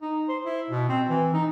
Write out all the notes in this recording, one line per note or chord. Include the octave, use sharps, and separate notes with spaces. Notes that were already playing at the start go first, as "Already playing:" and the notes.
D#4
C5
E4
B2
C4
E3
D#4